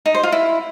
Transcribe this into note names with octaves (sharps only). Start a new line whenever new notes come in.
D#4
C5
F4
E4